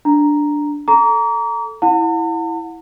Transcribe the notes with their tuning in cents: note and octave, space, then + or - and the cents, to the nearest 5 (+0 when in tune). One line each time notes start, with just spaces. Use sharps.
D4 +0 A#5 +0
A4 +0 A#5 +0 D6 -40
E4 +0 F#5 -30 A5 +45